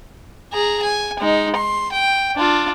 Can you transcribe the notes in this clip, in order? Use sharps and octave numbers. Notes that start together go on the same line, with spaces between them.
G#4 A#5
G#5
G#3 D#4
C6
G5
D4 F4